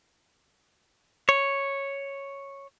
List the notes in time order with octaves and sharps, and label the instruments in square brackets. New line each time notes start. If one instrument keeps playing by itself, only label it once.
[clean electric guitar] C#5